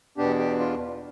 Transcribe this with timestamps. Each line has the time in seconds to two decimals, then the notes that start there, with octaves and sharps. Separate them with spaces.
0.18 E2 B2 B3 D4 G4
0.38 G4
0.59 F4